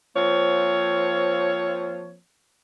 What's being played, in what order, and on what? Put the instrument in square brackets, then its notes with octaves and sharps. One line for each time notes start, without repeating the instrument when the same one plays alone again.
[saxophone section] F3 A#3 C4 C#5